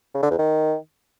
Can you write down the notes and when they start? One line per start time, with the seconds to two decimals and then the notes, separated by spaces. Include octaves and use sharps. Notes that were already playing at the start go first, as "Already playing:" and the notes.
0.15 C#3
0.23 D3
0.31 E2
0.39 D#3